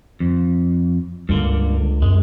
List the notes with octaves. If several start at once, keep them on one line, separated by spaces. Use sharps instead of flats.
F2
C#2 G2 D3 A#3
F#2 G#3